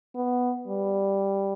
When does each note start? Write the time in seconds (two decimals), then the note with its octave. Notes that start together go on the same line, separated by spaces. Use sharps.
0.15 B3
0.68 G3